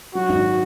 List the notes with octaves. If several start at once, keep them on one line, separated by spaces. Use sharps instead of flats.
F#3 F#4
G#1